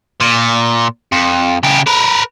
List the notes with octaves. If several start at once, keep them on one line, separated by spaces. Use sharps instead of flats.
A#2
F2
C#3 G4
A#4 B4